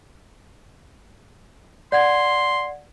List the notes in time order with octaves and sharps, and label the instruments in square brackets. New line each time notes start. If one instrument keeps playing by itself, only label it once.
[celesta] D5 F#5 G#6 [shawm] C6